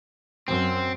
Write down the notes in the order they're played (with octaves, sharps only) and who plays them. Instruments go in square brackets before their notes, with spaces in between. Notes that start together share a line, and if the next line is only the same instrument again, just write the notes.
[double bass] F#2 [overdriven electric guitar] C4